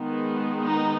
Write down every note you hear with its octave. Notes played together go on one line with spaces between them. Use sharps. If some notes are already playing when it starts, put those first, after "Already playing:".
Already playing: D#3 G#3 B3
D#4